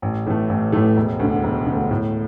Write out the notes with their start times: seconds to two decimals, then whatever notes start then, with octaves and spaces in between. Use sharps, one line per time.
0.02 A1
0.26 A2 E3 A3
0.49 A1
0.72 A2 E3 A3
0.97 E1
1.20 D2 D3
1.44 E1
1.67 D3
1.72 D2
1.91 A2